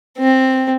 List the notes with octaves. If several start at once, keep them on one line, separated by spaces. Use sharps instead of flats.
C4